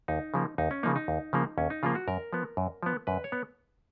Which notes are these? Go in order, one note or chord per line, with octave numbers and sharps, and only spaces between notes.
D#2 D#4
C#3 F3 A#3
D#2 D#4
C#4
C#3 F3 A#3 D#4
D#4
D#2
C#3 F3 A#3
D#2 C#4
D#4
C#3 F3 A#3 F4
F#4
F#2 A#4
F3 B3
F#2
F3 B3
F#2 B4
C#5
B3